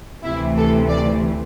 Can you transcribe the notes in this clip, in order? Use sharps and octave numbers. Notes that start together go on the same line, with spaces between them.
D2 C3 E3 A3 E4
A4
D5